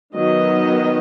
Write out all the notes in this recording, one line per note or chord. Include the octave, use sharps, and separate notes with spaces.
D#3 F#3 B3 D#5